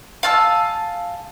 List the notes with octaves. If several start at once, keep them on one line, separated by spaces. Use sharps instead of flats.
F5 G#5 A5 E6